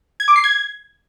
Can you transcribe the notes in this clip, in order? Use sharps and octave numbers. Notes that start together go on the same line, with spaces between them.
G#6
D6
C7
G#6